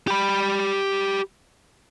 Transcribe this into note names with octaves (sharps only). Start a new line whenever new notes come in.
G4 B5